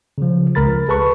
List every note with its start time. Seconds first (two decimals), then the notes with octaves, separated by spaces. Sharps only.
0.18 C#3 F3
0.55 C#2 A#4 B5 A6
0.88 G#4 A4 B4 A5 B5 C#6